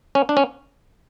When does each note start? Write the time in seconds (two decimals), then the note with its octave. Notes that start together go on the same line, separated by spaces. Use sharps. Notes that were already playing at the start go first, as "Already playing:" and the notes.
0.15 C#4
0.29 D4
0.37 C#4